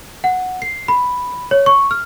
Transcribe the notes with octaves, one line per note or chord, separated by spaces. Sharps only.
F#5
C7
B5
C#5
C#6
F6